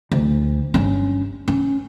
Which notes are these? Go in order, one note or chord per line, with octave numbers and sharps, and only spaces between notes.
D2
G1 C#4
C#4